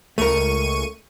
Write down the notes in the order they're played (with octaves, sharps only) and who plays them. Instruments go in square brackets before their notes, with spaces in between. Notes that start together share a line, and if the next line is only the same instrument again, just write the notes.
[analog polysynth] C#2 C#6 D#7 [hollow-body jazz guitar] A3 A#4